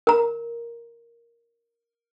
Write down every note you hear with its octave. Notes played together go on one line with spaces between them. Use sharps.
A#4 A#5